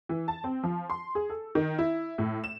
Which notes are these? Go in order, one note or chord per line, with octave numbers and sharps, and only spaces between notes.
E3
A5
C4
F3
C6
G#4
A4
D#3
E4
A2
E7